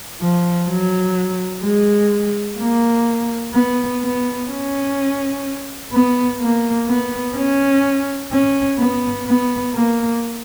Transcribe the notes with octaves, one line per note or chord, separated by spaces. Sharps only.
F3
F#3
G#3
A#3
B3
B3
C#4
B3
A#3
B3
C#4
C#4
B3
B3
A#3